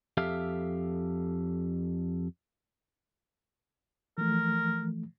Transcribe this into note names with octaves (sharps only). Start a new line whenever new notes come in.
F2 G4 A4 E5 F5
E3 F3 A3 A#4